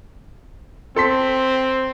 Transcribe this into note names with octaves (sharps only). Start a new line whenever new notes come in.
C4 A4 C6 B6